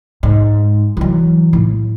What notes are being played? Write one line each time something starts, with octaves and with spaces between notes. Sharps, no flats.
G#2
E3 F#3
A2